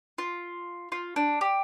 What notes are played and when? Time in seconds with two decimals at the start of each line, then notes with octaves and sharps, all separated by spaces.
0.18 F4
0.92 F4
1.16 D4
1.41 G4